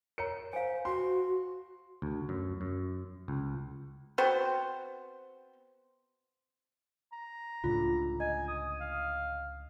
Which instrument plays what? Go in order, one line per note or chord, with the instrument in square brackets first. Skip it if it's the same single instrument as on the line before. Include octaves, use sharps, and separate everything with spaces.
[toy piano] A#4 C#5 A#5 [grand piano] C#7
[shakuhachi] C5 [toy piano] F5 G#5
[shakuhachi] F#4 [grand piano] C6
[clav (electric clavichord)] D2
F#2
F#2
C#2
[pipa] B3 C4 F#4 C5
[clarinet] A#5
[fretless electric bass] C#2 A2 D3 [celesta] F4
[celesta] D#5 [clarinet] G#5
[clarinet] D#6
F5